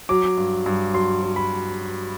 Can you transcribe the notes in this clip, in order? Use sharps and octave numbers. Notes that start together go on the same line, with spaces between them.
F#3 D6
G2
G2
F#3 C6
F#3
B5